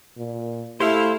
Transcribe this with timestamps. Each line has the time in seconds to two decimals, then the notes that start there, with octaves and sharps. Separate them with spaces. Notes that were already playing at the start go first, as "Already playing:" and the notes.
0.17 A#2
0.80 A3 E4 G4 C5 F5